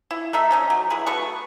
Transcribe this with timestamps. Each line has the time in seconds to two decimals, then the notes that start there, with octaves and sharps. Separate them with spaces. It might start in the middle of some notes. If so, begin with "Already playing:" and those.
0.11 E4
0.33 A3 D#4 E5
0.51 D3 C#4 D#4
0.70 F#3
0.90 E3 E4 G#4
1.07 A3 B3 F#4 C#6